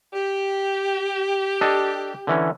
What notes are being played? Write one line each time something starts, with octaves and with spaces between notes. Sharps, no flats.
G4
D4 A4 D#5
D3 E3 C#4